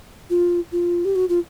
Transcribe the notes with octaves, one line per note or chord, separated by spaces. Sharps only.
F4
F4
G4
F#4
F4